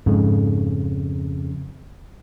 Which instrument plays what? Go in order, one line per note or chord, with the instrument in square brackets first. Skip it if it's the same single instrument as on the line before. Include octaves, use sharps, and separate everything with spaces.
[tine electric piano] F2 C#3 [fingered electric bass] G#2